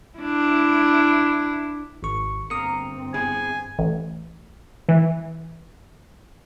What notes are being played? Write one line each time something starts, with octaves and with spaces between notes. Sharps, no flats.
D4 E4
G#1 C#6
G1 A#3 C4 A#4 D#6 C#7
B3 E4 G#4 G#5
A1
E3